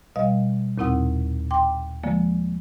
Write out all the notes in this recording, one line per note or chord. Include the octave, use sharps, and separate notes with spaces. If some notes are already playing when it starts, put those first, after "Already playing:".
B2 G3 D#5 F5
D#2 A#2 C4 E4 F#5 D#6
G5 C6 D6
D3 F3 G#3 A#3